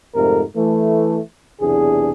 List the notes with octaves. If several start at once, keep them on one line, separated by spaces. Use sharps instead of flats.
F2 G#2 C3 A3 A#4
E3 A3
B1 E2 C3 D4 G#4